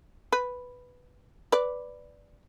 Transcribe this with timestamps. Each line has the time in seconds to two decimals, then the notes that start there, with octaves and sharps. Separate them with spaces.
0.32 B4
1.52 B4 D5